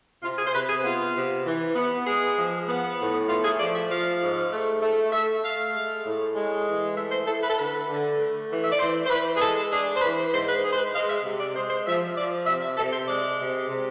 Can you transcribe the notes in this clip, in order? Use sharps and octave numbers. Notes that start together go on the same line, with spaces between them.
C3 F4
G#4
C5
C3 B4
G#4
B3 F4
C3
E3
B3
G#3 G#4
F3
B3
A2
A3 F4
G#4
F3 D5
E5
F3 F5
G#2
A3
A3
A3 E5
A3 F5
G#3
A2
G#3
E3
A3 E5
C5
E4 A4
B4
A4
D3 B4
D3
A3
E3
E5
D5
E3 C5
C5
E3 B4
G#4
G#3 A4
D4 G#4
C5
E3 B4
C5
G#2 C5
B4
G#3 G#4
C5
B4
G#3 F5
E5
C3
D5
G#3 C5
C5
F3 E5
F3 D5
C3 E5
E5
C3 A4
C5
G#3 D5
C3
C3